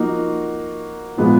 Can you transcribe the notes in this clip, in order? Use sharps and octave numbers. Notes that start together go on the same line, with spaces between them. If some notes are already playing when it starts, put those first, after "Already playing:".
Already playing: F3 A#3 D#4 F#4
A#2 F3 G#3 B3 F4